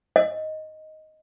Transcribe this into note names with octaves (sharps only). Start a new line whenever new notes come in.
D#5